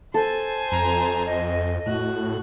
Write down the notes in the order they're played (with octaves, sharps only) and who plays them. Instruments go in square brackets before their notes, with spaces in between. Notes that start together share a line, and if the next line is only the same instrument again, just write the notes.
[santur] A4 [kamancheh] C5 G#5
[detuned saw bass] F2 [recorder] A#5
[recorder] D#5
[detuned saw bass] A2 [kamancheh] F#4 F#6